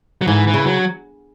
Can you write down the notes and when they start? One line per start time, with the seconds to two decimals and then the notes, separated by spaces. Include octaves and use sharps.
0.22 F#3
0.27 G#2 E3
0.47 E3
0.54 C#3
0.66 F#3